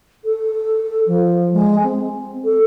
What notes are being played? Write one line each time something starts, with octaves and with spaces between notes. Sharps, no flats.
A4
F3
G#3
C4
A4